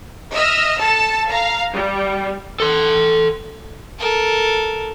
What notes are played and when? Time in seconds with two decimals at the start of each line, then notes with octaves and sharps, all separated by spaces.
0.33 D#5 E5 E6 F6
0.78 A4 A5
1.30 F5 A#5
1.72 G3
2.60 A4 C6
3.99 A4 A#4